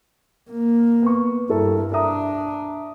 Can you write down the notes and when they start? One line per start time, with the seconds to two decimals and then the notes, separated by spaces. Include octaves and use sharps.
0.51 A#3
1.02 B3 C#6
1.49 G2 E4 A4 A#4
1.93 D4 E5 A#5 D#6